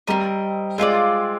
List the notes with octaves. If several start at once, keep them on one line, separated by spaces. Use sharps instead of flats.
G3 C4 F4 A#4 D#5
G#3 C4 F4 A#4 D5